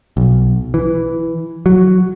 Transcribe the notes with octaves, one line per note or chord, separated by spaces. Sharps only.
B1
E3
F#3